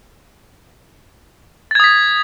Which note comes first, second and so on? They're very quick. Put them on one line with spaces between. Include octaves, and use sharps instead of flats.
A6 G#6 D#6 B6